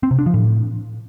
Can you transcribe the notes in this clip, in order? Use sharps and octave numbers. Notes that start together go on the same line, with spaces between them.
C4
C3
D4
F3
A2